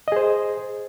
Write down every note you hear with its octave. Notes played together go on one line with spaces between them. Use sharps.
G#4 C5 D#5